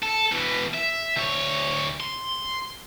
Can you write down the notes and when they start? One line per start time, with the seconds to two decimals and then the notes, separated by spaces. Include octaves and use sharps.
0.02 A4
0.32 B2 E3
0.74 E5
1.17 D2 C#5
2.01 C6